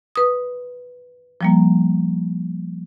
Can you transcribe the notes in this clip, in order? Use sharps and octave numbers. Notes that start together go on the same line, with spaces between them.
B4 D#6
F3 G3 A#3